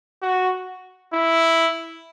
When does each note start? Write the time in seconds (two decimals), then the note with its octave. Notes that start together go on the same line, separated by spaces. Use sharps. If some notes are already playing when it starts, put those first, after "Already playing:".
0.22 F#4
1.14 E4